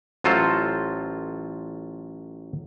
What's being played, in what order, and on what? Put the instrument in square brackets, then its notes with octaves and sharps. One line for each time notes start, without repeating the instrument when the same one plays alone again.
[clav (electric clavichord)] A1 F#3 F4 A4 C5